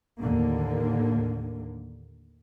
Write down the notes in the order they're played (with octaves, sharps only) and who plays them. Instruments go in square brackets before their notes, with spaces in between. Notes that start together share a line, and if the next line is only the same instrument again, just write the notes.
[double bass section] D#2 A2 D3 A#3